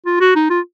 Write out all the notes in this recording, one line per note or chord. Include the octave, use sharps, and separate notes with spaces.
F4
F#4
D#4
F4